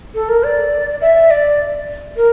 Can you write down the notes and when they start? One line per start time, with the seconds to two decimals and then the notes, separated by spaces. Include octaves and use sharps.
0.15 A4
0.29 A#4
0.44 D5
1.01 E5
1.31 D5
2.17 A#4